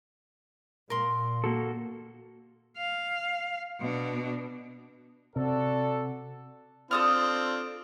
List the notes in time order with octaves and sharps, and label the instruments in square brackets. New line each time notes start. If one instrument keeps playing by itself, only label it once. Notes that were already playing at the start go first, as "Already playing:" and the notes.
[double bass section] A#2 [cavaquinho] A#4 C6
[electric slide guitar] A#3 F#4 A4
[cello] F5
B2 D4
[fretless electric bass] C3 [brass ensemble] F#4 A4 D5
[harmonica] C4 D4 F4 [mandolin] A4 D#6 F6